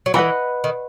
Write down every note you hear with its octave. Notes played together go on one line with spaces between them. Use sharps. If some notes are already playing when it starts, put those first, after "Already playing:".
F#3
E3 B4 D#5 F#5 B5
D#3